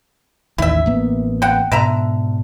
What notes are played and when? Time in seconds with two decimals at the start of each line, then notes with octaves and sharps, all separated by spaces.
0.58 A1 D#2 D#3 E4 E5
0.86 A1 A#3 B3
1.42 F#5 G5
1.72 G#2 B2 D3 E5 A#5